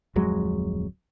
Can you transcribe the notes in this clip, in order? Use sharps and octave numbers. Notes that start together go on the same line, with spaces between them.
D1 F2 F#3 G#3